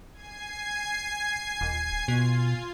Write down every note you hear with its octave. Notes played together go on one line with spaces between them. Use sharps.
G#5 G#6 C7
D#1
B2 F4